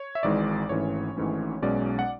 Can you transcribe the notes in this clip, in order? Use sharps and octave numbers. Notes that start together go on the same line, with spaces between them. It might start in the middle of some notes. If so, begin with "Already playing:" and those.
Already playing: C#5
E5
G#1 G#2 E3 G#3 D5
G#1 G#2 E3 A3 C#4 C#5
G#1 G#2 E3 A3 C#4
B1 B2 G#3 C#4 D5
F#5